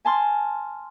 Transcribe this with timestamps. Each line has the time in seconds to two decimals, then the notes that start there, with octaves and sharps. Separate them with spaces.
0.05 G#5 A5 C6 F6